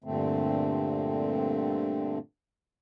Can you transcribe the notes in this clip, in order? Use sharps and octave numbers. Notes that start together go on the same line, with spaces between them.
G2 A#2 D3 A3 C4